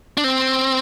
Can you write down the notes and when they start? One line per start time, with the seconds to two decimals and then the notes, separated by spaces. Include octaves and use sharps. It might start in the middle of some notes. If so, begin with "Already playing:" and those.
0.17 D4
0.24 C4